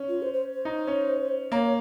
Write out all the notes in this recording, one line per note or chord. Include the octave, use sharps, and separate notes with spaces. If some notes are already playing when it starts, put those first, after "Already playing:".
Already playing: C#4
F4
C5
C5
C5
D#4
C#4
A#3 C#5
C#5